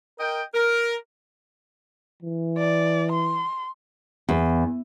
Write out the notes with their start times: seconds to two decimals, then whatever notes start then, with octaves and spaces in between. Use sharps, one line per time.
0.19 A#4 D#5 G5
0.55 A#4
2.22 E3
2.58 D5
3.12 C6
4.29 E2